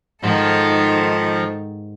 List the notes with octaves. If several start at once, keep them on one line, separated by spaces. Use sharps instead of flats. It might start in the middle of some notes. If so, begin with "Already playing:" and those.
G#2 D#3 F3 A4